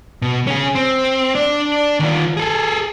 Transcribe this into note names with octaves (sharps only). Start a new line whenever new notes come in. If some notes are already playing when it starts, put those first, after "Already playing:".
B2
C#4 G#4
C4
D4 D5
D#3 F4
G#4 A4